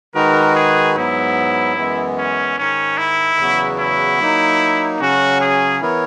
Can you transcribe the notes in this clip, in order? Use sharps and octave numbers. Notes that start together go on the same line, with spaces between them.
D#3 G#3 D#4 F#4 A#4 B4
G#4
G#2 F#3 B3 E4
F#2 E3 G#3 B3
C#4
G#2 D#3 G#3 C#4 D#4
E4
E2 C#3 F#3 B3 F#4
E4
F#3 A#3 D#4
C#3 F#3 C#4 F#4
G#4
E3 B3 E4 A#4 C#5